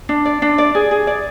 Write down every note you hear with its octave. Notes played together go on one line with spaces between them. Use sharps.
D4
D5
D4
D5
G#4
G#4
D5